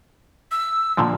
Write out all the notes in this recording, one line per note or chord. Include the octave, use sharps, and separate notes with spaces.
E6
A#2 D3 F3